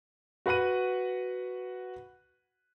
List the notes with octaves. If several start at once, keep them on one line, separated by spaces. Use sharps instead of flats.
F#4 B4 F#5 F#6 D#7